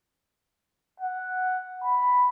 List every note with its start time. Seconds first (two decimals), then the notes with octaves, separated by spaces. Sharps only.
1.00 F#5
1.84 B5